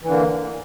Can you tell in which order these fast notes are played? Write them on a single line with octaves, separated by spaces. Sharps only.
E3 D3 A#3